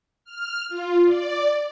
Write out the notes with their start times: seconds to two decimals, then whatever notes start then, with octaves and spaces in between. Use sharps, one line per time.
0.24 F6
0.69 F4
1.04 D5